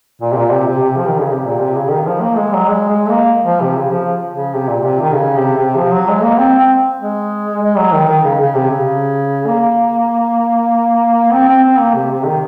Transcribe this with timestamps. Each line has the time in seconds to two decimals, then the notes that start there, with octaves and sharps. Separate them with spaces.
0.21 A#2
0.32 C3
0.36 A#2
0.52 C3
0.67 C3
0.83 C3
0.97 F3
1.08 D#3
1.21 C#3
1.32 C3
1.44 A#2
1.60 C3
1.75 C#3
1.91 D#3
2.07 F3
2.21 A#3
2.37 G#3
2.53 F#3
2.69 G#3
2.89 G#3
3.09 A#3
3.45 F3
3.61 C3
3.76 C#3
3.92 F3
4.33 C#3
4.54 C3
4.69 A#2
4.84 C3
5.00 D#3
5.14 C#3
5.36 C3
5.57 C3
5.76 F3
5.92 F#3
6.08 G#3
6.23 A#3
6.39 C4
6.59 C4
7.01 G#3
7.62 G#3
7.77 F#3
7.93 D#3
8.08 D#3
8.24 C#3
8.39 C#3
8.54 C3
8.71 C#3
9.47 A#3
11.33 C4
11.48 C4
11.63 C4
11.79 A#3
11.95 C3
12.10 C3
12.25 D#3